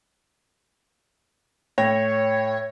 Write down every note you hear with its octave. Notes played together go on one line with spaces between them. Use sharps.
A2 C#5 G5 A#6